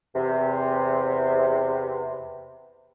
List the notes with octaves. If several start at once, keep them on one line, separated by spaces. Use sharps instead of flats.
E2 C3